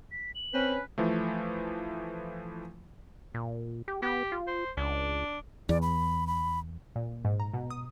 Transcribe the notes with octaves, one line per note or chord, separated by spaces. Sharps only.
B6
F#7
C4 C#4 B4
E3 F3 A3
A#2
G4
B3 G4
F4
C5
C#2 D4
E2 D5
B5
B5
A#2
G#2
A#5
B2
D#6